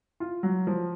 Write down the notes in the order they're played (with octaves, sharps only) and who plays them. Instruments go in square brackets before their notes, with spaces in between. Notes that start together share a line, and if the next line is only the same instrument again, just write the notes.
[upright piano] F4
F#3
F3